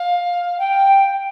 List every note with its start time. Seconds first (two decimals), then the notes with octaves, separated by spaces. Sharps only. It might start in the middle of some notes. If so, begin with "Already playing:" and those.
Already playing: F5
0.59 G5